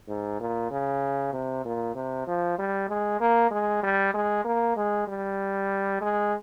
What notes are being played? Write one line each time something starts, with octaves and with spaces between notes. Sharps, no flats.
G#2
A#2
C#3
C3
A#2
C3
F3
G3
G#3
A#3
G#3
G3
G#3
A#3
G#3
G3
G#3